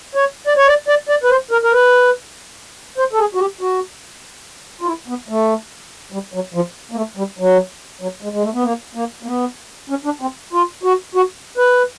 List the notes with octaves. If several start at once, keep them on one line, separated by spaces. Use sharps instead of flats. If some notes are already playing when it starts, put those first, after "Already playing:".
C#5
D5
C#5
D5
D5
D5
B4
C5
A#4
A#4
B4
C5
A4
G#4
F#4
G4
F#4
F4
E4
B3
A3
G3
F#3
F3
A#3
A3
G3
F#3
F#3
G#3
G#3
A3
B3
A#3
A#3
A#3
B3
C#4
D4
C4
F4
F#4
F#4
B4